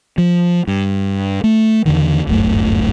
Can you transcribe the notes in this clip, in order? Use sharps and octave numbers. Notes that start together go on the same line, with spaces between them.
F3
G2
A3
E2 D3 D#3
D1 G1 F#2 A3